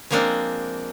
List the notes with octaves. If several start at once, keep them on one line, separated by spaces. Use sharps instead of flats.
F3 G#3 A#3 C4 D4